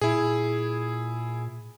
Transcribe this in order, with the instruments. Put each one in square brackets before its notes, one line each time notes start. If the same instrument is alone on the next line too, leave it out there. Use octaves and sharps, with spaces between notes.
[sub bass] A#2 [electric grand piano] E4 G#4